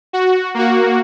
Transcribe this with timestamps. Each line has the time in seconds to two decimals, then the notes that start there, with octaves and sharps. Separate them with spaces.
0.13 F#4
0.54 A#3 F#4